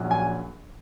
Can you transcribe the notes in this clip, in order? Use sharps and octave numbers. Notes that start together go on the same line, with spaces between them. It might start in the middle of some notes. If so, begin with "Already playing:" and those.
Already playing: A#1 A#2 F#3 C#4
G#5